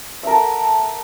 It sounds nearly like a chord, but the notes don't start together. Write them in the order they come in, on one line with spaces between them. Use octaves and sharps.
E5 A#4 A4 F#5